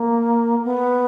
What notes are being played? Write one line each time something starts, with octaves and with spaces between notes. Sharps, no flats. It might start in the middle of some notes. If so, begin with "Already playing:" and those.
Already playing: A#3
B3